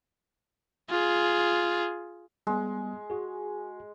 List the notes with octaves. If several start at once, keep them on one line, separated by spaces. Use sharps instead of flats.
F4 G#4
G3 G#3 B3
F#4 G#4